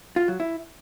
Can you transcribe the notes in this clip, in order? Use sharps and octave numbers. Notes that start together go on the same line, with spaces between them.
F4
F#3
E4